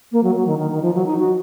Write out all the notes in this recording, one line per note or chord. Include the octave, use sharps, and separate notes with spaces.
A#3
F#3
F#3
D#3
D#3
D#3
F3
F#3
D#4
F#4